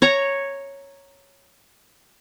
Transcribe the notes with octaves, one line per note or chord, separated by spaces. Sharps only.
C#5 A#5